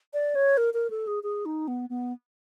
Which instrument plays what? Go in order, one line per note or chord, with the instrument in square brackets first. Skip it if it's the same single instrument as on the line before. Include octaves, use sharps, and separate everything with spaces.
[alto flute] D5
C#5
A#4
A#4
A4
G#4
G#4
D#4
B3
B3